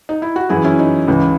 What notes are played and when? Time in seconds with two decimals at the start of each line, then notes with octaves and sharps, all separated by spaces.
0.09 D#4
0.22 E4
0.36 F#4
0.49 F#2 E3 E4 G#4
0.64 C#4 E4
0.79 D#4
1.08 C#2 C#3 E3